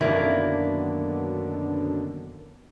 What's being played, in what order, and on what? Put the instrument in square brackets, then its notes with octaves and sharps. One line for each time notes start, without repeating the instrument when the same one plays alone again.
[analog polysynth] F#2 B2 D3 [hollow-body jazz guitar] D#3 A#3 D4 [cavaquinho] E4